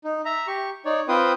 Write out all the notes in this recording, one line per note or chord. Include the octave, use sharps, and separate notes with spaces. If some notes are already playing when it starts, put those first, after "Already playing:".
D#4
E5 A#5
G4 C#6
D#4 C#5 D5
C4 F4 B4 C5 G5 D#6